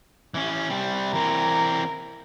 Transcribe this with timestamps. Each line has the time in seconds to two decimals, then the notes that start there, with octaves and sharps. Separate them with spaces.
0.34 E3 C#4
0.69 G3 C4
1.13 E3 C4 A#4